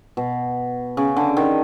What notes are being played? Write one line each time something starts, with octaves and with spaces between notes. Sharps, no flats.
B2
C#3
D3
D#3